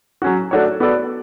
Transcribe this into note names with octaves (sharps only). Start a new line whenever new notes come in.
F#3 C#4 F#4
A3 D4 F#4 C#5
B3 F#4 A4 D5